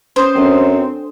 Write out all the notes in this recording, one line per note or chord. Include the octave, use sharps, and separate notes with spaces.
C#4 B4 C5 D#6
F#2 C4 D4 A4